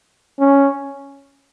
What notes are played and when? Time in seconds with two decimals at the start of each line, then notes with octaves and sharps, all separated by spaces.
0.39 C#4